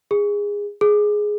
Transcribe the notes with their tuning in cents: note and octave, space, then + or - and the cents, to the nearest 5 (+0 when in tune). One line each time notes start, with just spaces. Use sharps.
G#4 -20
G#4 +5